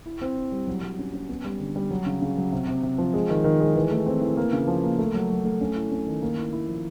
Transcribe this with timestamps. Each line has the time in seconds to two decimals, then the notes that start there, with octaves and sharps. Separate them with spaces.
0.06 E4
0.21 C4
0.37 E4
0.52 G3
0.67 F#3
0.83 F#3
0.99 C#4
1.13 C#4
1.29 B3
1.45 G3
1.60 D3
1.76 G3
1.91 F#3
2.06 C#3
2.22 C#3
2.37 F#3
2.52 C3
2.68 C3
2.83 C3
2.98 F3
3.14 G#3
3.30 D#3
3.44 D#3
3.60 G#3
3.76 E3
3.91 A3
4.06 C4
4.21 E3
4.37 A#3
4.53 C#3
4.67 F3
4.84 A#3
4.99 A3
5.14 F#3
5.30 F#3
5.44 A3
5.61 C#4
5.76 E4
5.92 C#4
6.06 D#3
6.22 A#3
6.38 E4
6.53 E4
6.68 F3